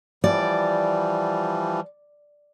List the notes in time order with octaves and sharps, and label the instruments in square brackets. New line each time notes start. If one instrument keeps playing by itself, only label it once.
[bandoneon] E3 F3 G3 [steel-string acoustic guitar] D5